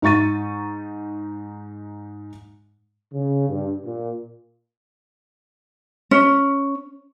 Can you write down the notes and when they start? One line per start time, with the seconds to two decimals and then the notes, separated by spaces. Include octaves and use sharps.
0.02 G#2 D#4 C#6 A6 D#7
3.13 C#3
3.49 G2
3.85 A#2
6.11 C#4